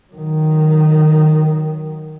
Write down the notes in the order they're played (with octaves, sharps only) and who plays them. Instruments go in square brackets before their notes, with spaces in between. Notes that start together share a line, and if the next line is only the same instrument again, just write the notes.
[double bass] D#3 F#3